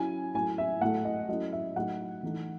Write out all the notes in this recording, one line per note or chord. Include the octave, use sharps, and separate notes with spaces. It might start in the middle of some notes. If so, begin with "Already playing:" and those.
Already playing: F#3 C#4 E4 G#5
F#3 A3 E4 G#5
E5
A2 F#3 A3 F#5
D#5
F#3 A3 C#4 E4 D#5
E5
F#3 A3 D#4 F#5
E3 A3 D#4